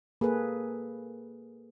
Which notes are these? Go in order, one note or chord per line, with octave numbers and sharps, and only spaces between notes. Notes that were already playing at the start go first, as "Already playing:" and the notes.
A#3 G#4 A4 B4